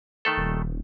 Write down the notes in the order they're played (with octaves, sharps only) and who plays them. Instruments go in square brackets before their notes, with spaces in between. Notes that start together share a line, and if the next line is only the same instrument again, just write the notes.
[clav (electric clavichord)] D#3 A3 A4
[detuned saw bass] D#1